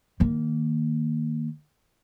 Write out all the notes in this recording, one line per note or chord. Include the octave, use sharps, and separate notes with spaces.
D#3 A#3